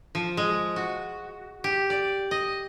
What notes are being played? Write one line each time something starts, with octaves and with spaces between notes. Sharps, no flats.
F3
G#3
F#4
G4
D5
D#5